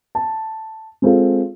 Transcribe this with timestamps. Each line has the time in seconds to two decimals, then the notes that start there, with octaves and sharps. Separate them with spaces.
0.15 A5
1.02 G#3 C4 F4 A4